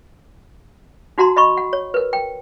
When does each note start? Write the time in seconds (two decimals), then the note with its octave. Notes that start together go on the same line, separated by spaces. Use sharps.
1.18 D#4 F#4 F#5 A#5 C6
1.36 D#5 B5 C#6
1.58 F#5
1.73 C#5
1.94 A#4 B4
2.13 G5